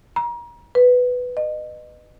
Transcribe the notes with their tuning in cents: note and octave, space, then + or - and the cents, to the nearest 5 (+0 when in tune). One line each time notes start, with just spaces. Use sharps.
A#5 +30
B4 +5
D#5 -30